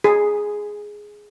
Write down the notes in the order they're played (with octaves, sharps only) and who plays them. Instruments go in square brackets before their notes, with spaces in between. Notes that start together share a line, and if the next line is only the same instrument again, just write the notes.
[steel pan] G#4